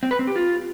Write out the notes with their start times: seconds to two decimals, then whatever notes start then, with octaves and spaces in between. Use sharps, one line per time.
0.03 C4
0.11 B4
0.19 C4
0.27 G4
0.36 F4